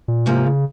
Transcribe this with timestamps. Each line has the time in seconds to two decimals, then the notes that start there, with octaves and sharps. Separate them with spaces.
0.08 A#2
0.26 G#2 C3 F3 A#3
0.45 C#3